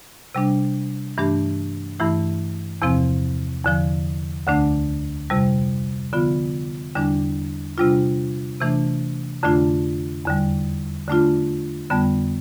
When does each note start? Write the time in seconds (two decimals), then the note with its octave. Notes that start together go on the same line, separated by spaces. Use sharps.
0.35 C3 G3 D4
1.18 G2 E3 A3 D4 G4
1.99 G2 E3 A3 E4
2.82 E2 C3 F3 C4
3.65 E2 D3 F3
4.47 D2 D3 A3 D4
5.30 F2 C3 G3
6.13 D3 F3 B3 F4
6.95 E2 D3 G3 D4
7.78 C3 G3 D4 F4
8.61 C3 E3 A3 D4
9.43 F2 D3 A3 D4 F4
10.25 E2 D3 G3
11.08 D3 A3 D4 F4
11.90 F2 D3 G3 B3